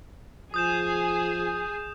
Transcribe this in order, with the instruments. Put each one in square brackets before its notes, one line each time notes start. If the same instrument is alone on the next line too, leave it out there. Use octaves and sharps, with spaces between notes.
[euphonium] F3 [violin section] G#4 [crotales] D#6 G6 E7